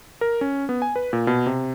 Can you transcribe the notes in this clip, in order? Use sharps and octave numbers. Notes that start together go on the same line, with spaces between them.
A#4
C#4
B3
G#5
B4
A#2
B2
C3